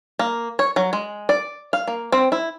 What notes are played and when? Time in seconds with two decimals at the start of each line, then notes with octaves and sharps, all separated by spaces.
0.19 A#3
0.59 C#5
0.76 F#3
0.93 G#3
1.29 D5
1.73 F5
1.87 A#3
2.12 C4
2.32 E4